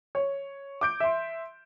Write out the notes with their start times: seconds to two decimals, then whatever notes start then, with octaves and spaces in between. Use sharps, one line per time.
0.15 C#5
0.81 D6 G6 D7
1.00 E5 C6